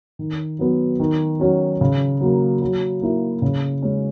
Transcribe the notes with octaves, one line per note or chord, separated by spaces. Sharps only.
D#3
F#3 B3
D#3
F#3 C#4 F#4
C#3
F#3 A#3
F#3
A#3 E4
C#3
G#3 C#4